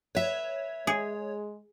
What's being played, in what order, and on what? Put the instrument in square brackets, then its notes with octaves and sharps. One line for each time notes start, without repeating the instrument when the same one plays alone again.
[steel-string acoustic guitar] B4 E5 [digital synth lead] C#5
[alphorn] G#3 [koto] G#4